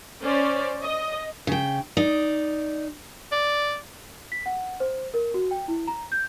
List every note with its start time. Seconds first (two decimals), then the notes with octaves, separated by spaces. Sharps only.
0.21 C#4 C5 D5
0.83 D#5
1.47 C#3 G5
1.97 D#4 D5
3.32 D5
4.32 B6
4.46 F#5
4.80 C5
5.14 A#4
5.34 F#4
5.51 G5
5.68 E4
5.88 A#5
6.12 G6